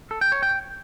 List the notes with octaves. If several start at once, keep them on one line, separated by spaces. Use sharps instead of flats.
A4
G5
C#5
G5